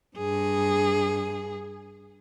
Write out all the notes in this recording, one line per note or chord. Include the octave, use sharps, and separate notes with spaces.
G2 G#4